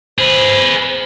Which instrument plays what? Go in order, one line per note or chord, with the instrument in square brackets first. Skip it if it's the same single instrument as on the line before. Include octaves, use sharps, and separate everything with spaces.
[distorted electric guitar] G#4 B4 [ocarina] C5